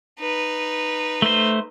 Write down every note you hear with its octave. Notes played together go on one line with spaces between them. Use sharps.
D#4 B4
A3 C5